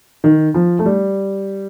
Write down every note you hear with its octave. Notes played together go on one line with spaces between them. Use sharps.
D#3
F3
A3
G3